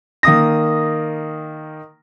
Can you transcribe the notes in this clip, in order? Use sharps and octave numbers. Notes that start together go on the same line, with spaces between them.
D#3 A#3 D#6 A#6